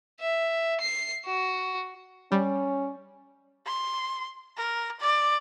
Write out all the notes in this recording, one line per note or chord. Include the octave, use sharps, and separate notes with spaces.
E5
C7
F#4
G3 C#4
C6
A#4
D5